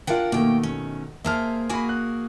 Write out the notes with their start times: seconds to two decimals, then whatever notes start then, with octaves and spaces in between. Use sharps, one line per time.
0.07 D4 F4 A#4 F#5 G5
0.32 B2 D#3 A3 A#3 G5
0.63 C#4
1.25 A#3 G#4 C5 E5 A5 F6
1.69 A#3 F#4 G#4 G#5 B5
1.89 F#6